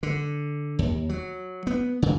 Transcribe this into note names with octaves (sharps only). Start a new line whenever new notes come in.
D3
D#2
F#3
B3
C#3